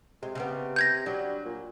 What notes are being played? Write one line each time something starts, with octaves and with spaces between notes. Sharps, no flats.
C3 G#3
C#3 G3 B3
G6 G#6 A#6
F#3 G3 D4
A#2